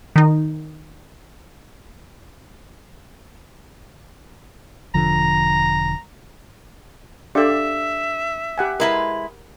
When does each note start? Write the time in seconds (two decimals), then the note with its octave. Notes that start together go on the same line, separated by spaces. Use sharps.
0.16 D#3 D#4
4.94 E1 D3 F3 A#5
7.35 D4 G4 A4 D5 E5 F5
8.58 G4 F#5 G#5
8.80 G#3 E4 A#4 B4